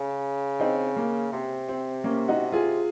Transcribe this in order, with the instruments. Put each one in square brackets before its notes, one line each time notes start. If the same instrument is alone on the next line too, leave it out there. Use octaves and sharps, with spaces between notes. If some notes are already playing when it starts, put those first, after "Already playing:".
Already playing: [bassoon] C#3
[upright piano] C4 D#4
A#3
[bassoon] C3 [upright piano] C4
[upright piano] C4
A#3 C#4
D#4 F#4
F4 G#4